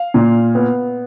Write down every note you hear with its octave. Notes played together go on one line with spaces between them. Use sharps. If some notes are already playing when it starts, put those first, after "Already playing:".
Already playing: F5
A#2
B3